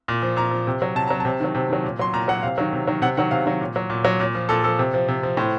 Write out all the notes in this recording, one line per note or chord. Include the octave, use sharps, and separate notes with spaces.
A#2
F3
A#2 A#5
F3
C3
F#3
C3 A5
F#3 A#5
C3 A5
D#3 F#3
C3
D#3 F#3
A#2
F#3 C6
A#2 A#5
F#3 F#5
C3 F5
D#3 F#3
C3
D#3 F#3
C3 F#5
D#3 F#3 F#5
C3 F5
D#3 F#3
A#2
F#3
A#2
F#3
A#2
F3
A#2 A4
F3 A4
C3
F3
C3
F3
A2 C5